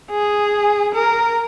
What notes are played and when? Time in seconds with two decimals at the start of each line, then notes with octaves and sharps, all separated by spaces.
0.11 G#4
0.95 A#4